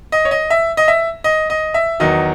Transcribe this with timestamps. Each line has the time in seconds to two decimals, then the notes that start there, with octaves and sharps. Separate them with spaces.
0.12 D#5
0.25 C#5
0.31 D#5
0.50 E5
0.77 D#5
0.88 E5
1.24 D#5
1.50 D#5
1.74 E5
2.00 E2 D#3 F#3 D#5